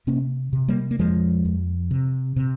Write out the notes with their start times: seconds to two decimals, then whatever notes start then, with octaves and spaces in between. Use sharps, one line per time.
0.07 C3 A#3 C#4
0.53 C3
0.68 G3 A#3
0.91 A#3
0.99 F2 F3 G#3
1.45 F2
1.91 C3
2.36 C3